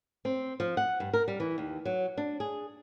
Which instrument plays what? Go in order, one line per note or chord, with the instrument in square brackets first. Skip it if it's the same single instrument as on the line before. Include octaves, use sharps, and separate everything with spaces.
[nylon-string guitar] C4
F3
F#5
G2
A#4
G3
E3
D#2
F#3
D4
G#4